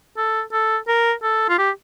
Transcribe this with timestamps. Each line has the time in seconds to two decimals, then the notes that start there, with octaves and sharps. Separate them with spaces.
0.17 A4
0.53 A4
0.88 A#4
1.23 A4
1.49 F4
1.58 G4